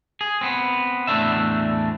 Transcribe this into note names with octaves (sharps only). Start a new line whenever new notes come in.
G#4
B3 C4
E2 A2 F3 A3 D4 E5